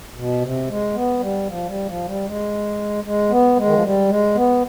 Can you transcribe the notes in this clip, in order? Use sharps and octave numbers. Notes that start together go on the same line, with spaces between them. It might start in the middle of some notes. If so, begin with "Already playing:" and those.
B2
C3
G#3
B3
G3
F3
G3
F3
G3
G#3
G#3
B3
G#3
D#3
F3
G3
G#3
B3